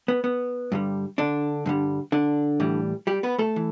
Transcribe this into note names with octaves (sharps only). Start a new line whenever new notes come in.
B3
B3
G2 D3 G3
D3 D4
G2 D3 G3
D3 D4
A2 E3 G3
G3 G4
B3 B4
A3 A4
E3